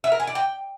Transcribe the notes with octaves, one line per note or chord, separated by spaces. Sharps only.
E5
A#4
G#5
D5
G5